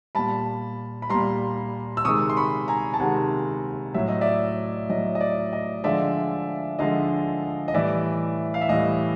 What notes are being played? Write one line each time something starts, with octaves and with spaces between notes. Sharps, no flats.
A#2 G3 A5 B5
B5
A#2 G3 A#5 C6
E6
C3 D#3 G#3 C#6 D#6
C6
B5 C#6
G#5 A#5
A5
C3 D#3 G#3 F#5 G#5
A2 F#3 E5
D#5
D5 E5
A2 F#3 D#5
D#5
D5
D#5
D3 F3 G#3 D5 E5
D3 F3 G#3 D#5 F5
D#5
A2 E3 G3 D5 E5
F5
E5
A2 E3 G3 D#5